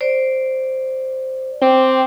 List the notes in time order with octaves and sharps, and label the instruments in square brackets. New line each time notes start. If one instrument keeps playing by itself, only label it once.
[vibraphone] C5 D5
[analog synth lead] C4 [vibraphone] G5 D6